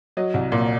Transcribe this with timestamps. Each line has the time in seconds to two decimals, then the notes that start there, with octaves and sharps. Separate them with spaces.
0.17 F#3 D#5
0.34 C2
0.52 A#2